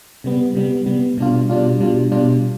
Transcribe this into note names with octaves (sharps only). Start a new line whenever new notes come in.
C3 G3 B3
C3 G3 B3
C3 G3 B3
B2 G3 D4 F4
B2 G3 D4 F4
B2 G3 D4 F4
B2 G3 D4 F4